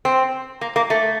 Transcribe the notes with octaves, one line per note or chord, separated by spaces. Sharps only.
C4
A#3
A#3
A3